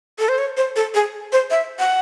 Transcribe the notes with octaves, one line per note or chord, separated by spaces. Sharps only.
A4
C5
C#5
C5
A4
G#4
C5
E5
F#5